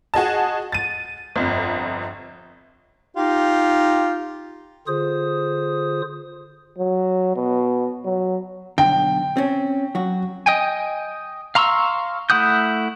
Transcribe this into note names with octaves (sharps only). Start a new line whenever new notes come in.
F#4 G#4 D#5 A5
A6 D#7
G1 F2
D#4 F4 G4
D3 F4 G#4 C5 D#6
F#3
B2
F#3
B1 D3 G5
C4 C#4
F#3 F#4
D#5 G5 G#5
F5 A#5 C6 C#6 E6
A3 E4 F#5 D#6 G6